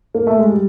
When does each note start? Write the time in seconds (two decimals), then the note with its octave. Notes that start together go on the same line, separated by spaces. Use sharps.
0.14 A#3
0.27 A3
0.38 G#3
0.50 G3